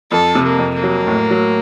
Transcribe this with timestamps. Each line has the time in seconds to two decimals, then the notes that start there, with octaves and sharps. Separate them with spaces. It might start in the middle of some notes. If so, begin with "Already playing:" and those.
0.11 F2 A4
0.35 C3
0.44 A#3
0.58 F2
0.75 A#3
0.83 F#3
1.07 A2
1.30 F#3